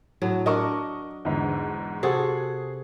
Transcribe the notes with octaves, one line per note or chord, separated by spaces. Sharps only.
A2 F#3
D4 A#4 D#5 C#6
E2 G#2 D3
C3 F#4 G#4 A4